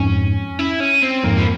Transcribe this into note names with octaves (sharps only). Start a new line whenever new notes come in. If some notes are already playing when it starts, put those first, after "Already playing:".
Already playing: F2 G#2 C#4
E4
C#4
C4
F2 G#2 A#3
F3